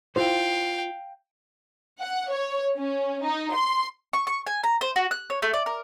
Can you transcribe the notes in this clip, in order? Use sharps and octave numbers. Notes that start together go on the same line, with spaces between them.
E4 F4 C5 F5 G5
F#5
C#5
C#4
D#4
C6
C#6
C#6
G#5
A#5
C5
F#4
F#6
C#5
A3
D5
A#4